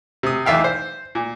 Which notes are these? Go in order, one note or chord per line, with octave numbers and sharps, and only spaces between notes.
C3 D#6
B1 E2 E5 F5 G5
C5
A#2